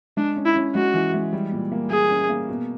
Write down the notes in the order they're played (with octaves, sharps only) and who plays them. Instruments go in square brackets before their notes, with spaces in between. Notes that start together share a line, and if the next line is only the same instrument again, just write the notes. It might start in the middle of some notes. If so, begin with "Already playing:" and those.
[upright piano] G#3 [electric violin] D4
[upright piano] C#4
[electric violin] E4
[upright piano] C#4
[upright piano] G#3 [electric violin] F#4
[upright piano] E3
G#3
G3
A#2
A#3
[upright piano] A#3 [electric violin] G#4
[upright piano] C#4
A#3
B2